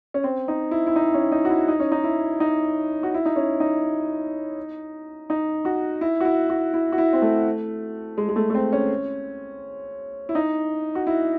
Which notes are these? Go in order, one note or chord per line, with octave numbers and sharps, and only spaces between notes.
C#4
C4
D#4
E4
E4
D#4
C#4
D#4
F#4
E4
D#4
C#4
D#4
E4
D#4
F#4
E4
D#4
C#4
D#4
D#4
F#4
E4
F#4
E4
F#4
E4
F#4
E4
C4
A3
G#3
G#3
A3
A3
C4
C#4
E4
D#4
F#4
E4